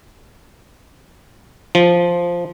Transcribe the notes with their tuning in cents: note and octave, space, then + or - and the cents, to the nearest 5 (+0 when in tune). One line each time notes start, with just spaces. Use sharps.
F3 -5